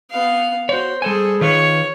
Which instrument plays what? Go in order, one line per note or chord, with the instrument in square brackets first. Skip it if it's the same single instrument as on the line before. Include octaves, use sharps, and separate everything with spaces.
[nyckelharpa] B3 F5
[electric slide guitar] F#4 C#5 [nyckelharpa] C5
[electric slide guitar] G3 C5 G#5 [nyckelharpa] G#4 A4
[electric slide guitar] D#3 F4 B4 [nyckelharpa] C#5